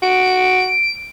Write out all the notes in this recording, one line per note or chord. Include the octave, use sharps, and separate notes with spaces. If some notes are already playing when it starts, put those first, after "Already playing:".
F#4 D7